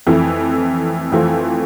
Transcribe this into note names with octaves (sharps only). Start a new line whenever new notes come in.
F2 E3 A3 E4
F2 E3 A3 C4 F4